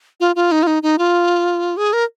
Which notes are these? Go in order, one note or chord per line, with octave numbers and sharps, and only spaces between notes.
F4
F4
D#4
F4
D#4
D#4
F4
G#4
A#4